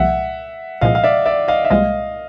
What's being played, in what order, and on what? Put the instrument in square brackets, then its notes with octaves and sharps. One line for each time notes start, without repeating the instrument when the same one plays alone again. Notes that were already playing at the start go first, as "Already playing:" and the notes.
Already playing: [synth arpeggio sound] C2 A#2 F3 G#3 [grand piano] E5 F#5
[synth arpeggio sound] C2 A#2 F3 G#3 [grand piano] D#5 F5
[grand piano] F5
D5 E5
D5 E5
D#5 F5
E5
[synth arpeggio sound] C2 A#2 F3 G#3 [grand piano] D#5 F5